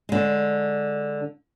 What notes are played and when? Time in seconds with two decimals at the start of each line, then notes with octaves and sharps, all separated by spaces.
0.09 D3 G#3